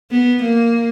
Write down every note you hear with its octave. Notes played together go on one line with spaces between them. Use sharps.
B3
A#3